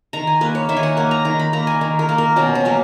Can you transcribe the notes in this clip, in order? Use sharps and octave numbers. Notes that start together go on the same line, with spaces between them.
D#3 A#5
G#5
A#3 B4
C#5
D#3 E5
G#5
F#5
A#3 G#5
A#5
D#3 A#5
B5
A#3 A#5
G#5
D#3
A#4
A#3
A#4
B2 C#4
C#4
F#3 A#3